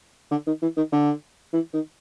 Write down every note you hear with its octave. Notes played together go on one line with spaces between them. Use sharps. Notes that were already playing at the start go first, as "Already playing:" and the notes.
D3
D#3
E3
D#3
D3
E3
D#3